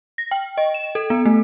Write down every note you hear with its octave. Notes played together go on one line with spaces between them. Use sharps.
A#6
G5
D#5
E7
A4
B3
A3